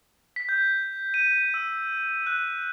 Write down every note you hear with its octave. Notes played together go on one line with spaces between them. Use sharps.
B6
G6
D#7
E6
F#6